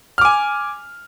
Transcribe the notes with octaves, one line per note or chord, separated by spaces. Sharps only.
G#5 D6 F6